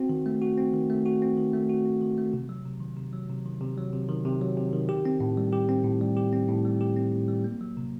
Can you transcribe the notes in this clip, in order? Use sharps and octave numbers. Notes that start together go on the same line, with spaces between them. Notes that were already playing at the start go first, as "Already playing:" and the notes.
Already playing: C4 F#4
D#3
A3
F#4
C4
D#3
A3
F#4
C4
D#3
A3
F#4
C4
D#3
A3
C3
F#3
C3
D#3
C3
F#3
C3
D#3
C3
F#3
C3
D#3
C3
F#3
C3
D#3
G4
C4
A2
G3
G4
C4
A2
G3
G4
C4
A2
G3
G4
C4
A2
G3
A#3
F#3
C3